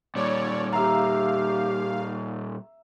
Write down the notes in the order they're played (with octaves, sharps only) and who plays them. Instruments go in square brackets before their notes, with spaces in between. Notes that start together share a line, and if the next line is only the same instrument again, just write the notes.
[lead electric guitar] A#2 G3 [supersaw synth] C#5 D5
[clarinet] G4 [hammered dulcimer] E5 A#5 [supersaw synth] F5